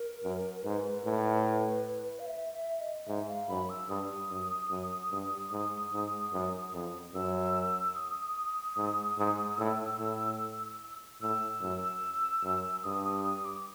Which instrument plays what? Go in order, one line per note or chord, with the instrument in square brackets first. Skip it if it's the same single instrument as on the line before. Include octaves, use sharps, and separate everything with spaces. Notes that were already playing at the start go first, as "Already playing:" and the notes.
Already playing: [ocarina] A#4
[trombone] F#2
[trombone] G#2 [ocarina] B4
[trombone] A2
[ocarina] F5
E5
E5
D#5
[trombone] G#2 [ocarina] E5
[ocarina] F5
[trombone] F#2 [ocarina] B5
[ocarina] E6
[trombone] G2 [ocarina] D#6
[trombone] F#2
F#2
G2
G#2
G#2
F#2
F2
[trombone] F#2 [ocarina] E6
[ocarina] D#6
[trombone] G#2
G#2
[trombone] A2 [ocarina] E6
[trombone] A2
[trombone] A2 [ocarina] E6
[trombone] F#2
F#2
[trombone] G2 [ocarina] D#6
[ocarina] D#6
D#6
D6